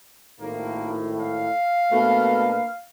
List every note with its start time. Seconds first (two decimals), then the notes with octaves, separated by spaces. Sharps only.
0.40 G#1 A2 A#3
1.20 F5
1.91 B2 A3 A#3 D4 B4